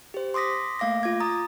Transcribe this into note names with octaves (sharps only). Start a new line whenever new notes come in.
G4 C5
C6 D6 D#6 A#6 B6
A3 A#3 F5 D6 A#6
F4 D6 G#6
A#5 D#6 A6